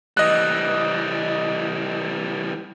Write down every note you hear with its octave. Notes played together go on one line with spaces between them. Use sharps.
E3 G3 D#5 F#6